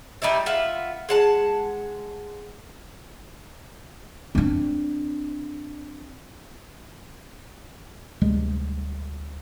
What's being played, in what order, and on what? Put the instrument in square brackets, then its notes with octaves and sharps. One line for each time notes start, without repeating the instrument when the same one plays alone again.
[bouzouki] G3 D#4 E4 E5
F4 E5 F#5
G#3 F#5 A5
[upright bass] C4 D4
[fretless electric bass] D2 C3 G3 G#3